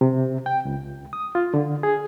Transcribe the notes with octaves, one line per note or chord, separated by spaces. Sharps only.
C3
G5
C#2
D#6
F4
D3
G#4